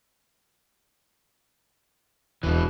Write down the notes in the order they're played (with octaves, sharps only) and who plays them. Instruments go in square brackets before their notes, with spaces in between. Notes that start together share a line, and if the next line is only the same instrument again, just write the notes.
[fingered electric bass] D#1 E2 [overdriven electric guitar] B2 E3